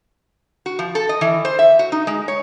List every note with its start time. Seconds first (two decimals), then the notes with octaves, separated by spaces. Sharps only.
0.66 F#4
0.79 F3
0.95 A4
1.09 D#5
1.21 E3
1.45 C5
1.59 E5
1.79 F#4
1.92 D#4
2.07 G#3
2.28 C#5